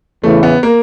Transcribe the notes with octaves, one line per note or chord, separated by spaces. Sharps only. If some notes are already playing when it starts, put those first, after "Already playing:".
E2 C#3 E3 A3
B3
A#3